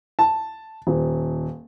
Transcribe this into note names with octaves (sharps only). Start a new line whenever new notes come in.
A5
D#1